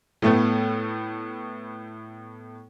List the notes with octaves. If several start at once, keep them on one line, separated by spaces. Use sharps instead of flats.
A2 A3 B3